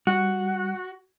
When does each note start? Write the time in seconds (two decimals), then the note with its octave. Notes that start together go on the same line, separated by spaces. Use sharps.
0.07 G3 F#4